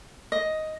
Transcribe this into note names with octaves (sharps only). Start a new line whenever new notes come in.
D#5